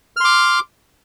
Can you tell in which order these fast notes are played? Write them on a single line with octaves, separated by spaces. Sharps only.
F6 C6 D6